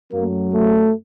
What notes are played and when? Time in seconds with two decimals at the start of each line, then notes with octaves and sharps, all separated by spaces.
0.12 F#2 F#3 A3 A#3
0.54 A3